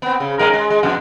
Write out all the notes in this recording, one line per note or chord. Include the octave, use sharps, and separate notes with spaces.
B3 C4
C#3
G2 G#3 A#4
G#3
G#3
F2 B2 D4